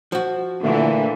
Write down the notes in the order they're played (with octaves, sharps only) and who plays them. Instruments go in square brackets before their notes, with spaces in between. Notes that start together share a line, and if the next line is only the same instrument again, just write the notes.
[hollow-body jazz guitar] F3 F#4
[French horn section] A#2 [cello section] D3 E3 [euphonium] A3